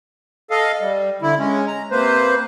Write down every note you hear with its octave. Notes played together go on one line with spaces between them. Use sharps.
A4 D#5 F5
G3
D3 E4
G#3 C#4
A#5
C3 A#3 B4 C5